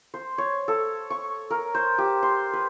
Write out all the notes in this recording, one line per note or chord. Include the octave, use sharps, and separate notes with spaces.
C5
C#5
A4
C#6
A#4
C5
G4
C6
B4